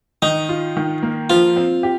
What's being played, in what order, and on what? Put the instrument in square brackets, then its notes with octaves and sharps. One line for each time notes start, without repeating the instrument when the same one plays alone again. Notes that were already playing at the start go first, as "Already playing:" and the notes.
[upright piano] D#3 [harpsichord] D#4
[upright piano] F4
D#3
A#3
[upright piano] F3 [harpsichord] F4
[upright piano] C4
G4